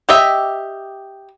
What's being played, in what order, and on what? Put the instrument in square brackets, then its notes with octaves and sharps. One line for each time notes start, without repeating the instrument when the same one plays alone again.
[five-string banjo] G4 D#5 E5